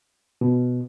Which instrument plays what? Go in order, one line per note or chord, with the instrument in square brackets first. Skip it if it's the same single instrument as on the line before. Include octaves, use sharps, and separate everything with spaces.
[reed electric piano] B2